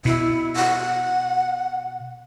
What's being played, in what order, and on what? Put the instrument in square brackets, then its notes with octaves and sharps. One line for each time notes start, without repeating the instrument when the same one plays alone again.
[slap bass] B2 [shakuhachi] E4
[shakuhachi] F#5